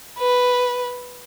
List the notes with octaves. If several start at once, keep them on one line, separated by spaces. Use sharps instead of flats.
B4